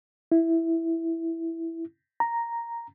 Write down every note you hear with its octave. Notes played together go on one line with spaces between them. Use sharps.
E4
A#5